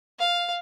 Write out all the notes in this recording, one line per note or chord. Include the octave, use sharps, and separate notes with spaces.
F5